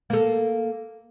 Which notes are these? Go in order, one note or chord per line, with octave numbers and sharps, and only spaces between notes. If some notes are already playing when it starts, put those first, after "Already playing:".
A#3 A4